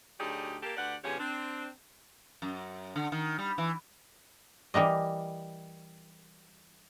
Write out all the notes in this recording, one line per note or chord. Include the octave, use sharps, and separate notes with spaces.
D2 F#3 D#4 G4 G#4 D5
A#3 G4 A4
D2 G4 B4 D5 F#5
B2 D3 F3 C#4 G4 G#4
C4 D4
F#2
D3
D#3
G3
E3
E3 G3 A#3 D#5